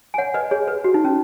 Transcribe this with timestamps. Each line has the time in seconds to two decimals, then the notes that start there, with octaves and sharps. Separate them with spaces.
0.14 G#5
0.18 C#5 F#5
0.34 B4 D#5
0.51 G#4 C#5
0.68 B4
0.84 F#4
0.94 D#4
1.05 C#4